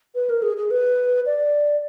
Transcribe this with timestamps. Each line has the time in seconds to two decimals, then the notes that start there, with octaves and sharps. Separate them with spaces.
0.15 B4
0.29 A#4
0.42 G#4
0.57 G#4
0.71 B4
1.26 D5